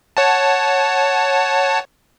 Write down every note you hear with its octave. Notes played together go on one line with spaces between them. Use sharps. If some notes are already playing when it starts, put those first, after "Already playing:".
C#5 F#5 A5